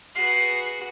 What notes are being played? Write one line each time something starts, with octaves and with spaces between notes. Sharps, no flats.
F#4 G#4 B4 C7